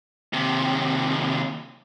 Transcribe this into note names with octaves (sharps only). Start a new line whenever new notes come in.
D#2 C3